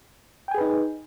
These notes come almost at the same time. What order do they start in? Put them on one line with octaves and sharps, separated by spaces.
G5 G#5 G#4 B4 D#4